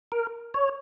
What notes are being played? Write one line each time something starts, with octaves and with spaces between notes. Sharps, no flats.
A#4
C#5